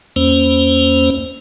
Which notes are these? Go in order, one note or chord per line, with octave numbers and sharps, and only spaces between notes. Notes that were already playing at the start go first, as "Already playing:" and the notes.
E2 A#3 C#4 C5